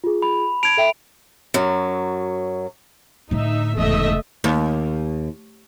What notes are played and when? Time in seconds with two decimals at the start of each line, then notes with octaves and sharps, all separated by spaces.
0.04 F4 G#4
0.22 B5
0.63 A5 G#6 D7 F7
0.77 A4 E5 G5
1.54 F#2 F#3
3.31 A2 D3 D#4 E5
3.77 F1 E2 G#2 C#3 A3 D#5 E5
4.44 D#2